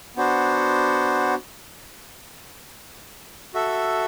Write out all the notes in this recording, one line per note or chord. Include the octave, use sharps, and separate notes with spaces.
B3 D4 F#4 C5
F#4 A4 E5